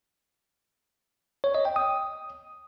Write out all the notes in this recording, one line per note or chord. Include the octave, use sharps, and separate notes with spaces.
C#5
D#5
G5
D#6